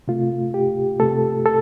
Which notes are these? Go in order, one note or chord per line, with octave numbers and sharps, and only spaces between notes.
C3 A3 F4
G4
C3 A3 A4
A4